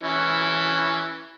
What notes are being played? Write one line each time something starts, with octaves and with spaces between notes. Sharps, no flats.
E3 C#4 E4